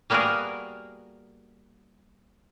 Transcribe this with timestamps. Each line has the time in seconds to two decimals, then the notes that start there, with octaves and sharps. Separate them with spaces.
0.10 G3 A#3 B3 F#4 G#4 A#4